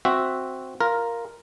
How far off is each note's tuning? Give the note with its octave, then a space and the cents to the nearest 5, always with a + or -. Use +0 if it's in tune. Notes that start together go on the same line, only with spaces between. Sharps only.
C4 +0 F#4 +0 E5 +0
F4 +0 A#4 +0